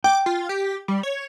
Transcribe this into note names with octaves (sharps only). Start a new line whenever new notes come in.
G5 D6
F4
G4
G3
C#5